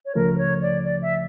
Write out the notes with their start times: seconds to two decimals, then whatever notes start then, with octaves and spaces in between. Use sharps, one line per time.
0.06 C#5
0.15 C#2 C#3 F3 A3 A#4
0.35 A#4
0.38 C#5
0.62 D5
0.84 D5
1.02 E5